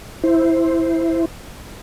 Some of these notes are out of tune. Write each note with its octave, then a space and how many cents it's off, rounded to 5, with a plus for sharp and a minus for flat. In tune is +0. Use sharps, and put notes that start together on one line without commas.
E4 +0 C5 +0